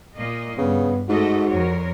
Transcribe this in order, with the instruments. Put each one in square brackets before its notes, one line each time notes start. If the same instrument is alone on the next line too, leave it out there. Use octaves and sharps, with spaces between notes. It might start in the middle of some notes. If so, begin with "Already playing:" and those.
[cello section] A#2 A#3 D#5
[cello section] G2 [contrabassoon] C#3 [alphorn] B3
[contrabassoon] G#2 [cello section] A3 A4 D#5 [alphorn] F#4
[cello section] F2 A#4 C#5